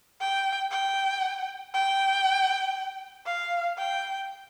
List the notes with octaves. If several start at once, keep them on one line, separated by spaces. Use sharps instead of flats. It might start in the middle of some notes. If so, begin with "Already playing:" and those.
G5
G5
G5
F5
G5